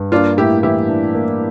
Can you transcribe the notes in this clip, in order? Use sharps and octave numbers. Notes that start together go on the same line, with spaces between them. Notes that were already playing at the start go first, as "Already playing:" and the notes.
Already playing: G2
A#3 D4 F4
A2 E4 G4
E3 E4 G4
D4
A#3